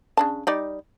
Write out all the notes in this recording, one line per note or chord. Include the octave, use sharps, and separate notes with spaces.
C#3 D4 A5
G3 D#4 D5